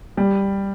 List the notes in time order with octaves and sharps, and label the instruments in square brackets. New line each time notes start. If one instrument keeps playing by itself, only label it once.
[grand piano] G3